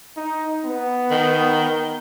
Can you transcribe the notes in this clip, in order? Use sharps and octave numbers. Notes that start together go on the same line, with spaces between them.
D#4
B3
D#3